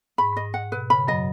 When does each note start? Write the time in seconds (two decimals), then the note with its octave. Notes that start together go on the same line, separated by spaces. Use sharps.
0.18 G#2 B5
0.36 D#5
0.54 F#5
0.72 B2 B4
0.90 C#3 B5
1.07 F#2 F#3 D#5